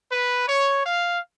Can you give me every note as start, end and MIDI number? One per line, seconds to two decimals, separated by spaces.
0.11 0.48 71
0.48 0.82 73
0.85 1.20 77